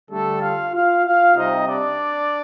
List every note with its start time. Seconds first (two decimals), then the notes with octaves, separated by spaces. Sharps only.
0.10 D3 G3 A3 D4 A4
0.41 F4 F5
0.73 F4 F5
1.05 F4 F5
1.36 C3 G3 C4 D#4 D#5
1.68 D4 D5